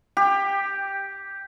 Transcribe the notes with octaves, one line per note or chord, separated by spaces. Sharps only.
G4